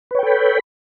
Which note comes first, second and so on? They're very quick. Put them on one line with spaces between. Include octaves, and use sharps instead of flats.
B4 C#5 G5 A4 B5